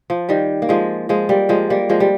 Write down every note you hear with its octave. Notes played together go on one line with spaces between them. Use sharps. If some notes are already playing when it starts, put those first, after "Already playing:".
F3
D#3 G3
A#3
F3 G#3
F3 G#3
G3 A#3
F3 G#3
G3 A#3
F3 G#3
G3